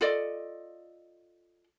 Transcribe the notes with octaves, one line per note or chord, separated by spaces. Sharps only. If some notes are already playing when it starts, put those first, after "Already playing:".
F4 A4 D5 D#5